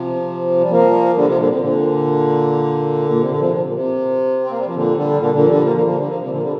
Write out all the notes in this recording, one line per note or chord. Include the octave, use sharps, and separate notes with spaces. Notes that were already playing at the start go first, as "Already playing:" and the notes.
Already playing: C3 F3
G3
F3 A#3
D3 G3
C3 F3
A#2 D3
C3
A#2 D3
A#2
C3
D3
C3 F3
C3
A#2
C3
C4
A#3
G3
F3
A#2 D3
D3 G3
A#2 D3
A#2 D3
F3
D3 G3
F3 A#3
F3 A#3
F3 A#3
D3 G3
F3 A#3
C3 F3
A#2 D3
A#3
D3 G3